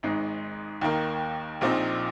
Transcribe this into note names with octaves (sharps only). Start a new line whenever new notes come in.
G#1 G#2 G#3 D#4
D#2 D#3 A#3 D#4
A#1 A#2 F3 C4 D#4